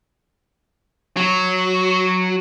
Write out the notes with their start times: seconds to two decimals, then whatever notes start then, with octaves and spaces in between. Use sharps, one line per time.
1.17 F#3